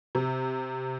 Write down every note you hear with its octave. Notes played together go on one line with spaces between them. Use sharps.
C3